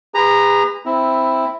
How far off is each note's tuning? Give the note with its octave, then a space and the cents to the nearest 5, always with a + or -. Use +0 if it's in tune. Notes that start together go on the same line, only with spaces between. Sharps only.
G#4 -40 B4 +20 A#5 +0
C4 +0 E4 +0